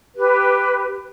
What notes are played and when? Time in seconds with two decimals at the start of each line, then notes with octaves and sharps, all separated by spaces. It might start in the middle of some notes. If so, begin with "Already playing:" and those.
0.15 G4 B4